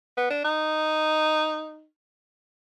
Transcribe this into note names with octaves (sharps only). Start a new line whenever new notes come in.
B3
D4
D#4